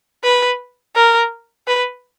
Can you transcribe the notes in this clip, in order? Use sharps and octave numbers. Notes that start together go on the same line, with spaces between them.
B4
A#4
B4